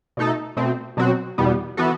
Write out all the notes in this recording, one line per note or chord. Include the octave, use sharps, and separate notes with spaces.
B2 A3 D#4 A4
B2 A3 C4
B2 F#3 C4 F#4
E2 B2 G3 B3
E3 B3 F#4 A4